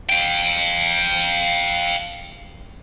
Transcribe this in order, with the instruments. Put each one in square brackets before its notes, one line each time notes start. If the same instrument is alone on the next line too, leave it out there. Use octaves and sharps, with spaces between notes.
[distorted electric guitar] F5 G5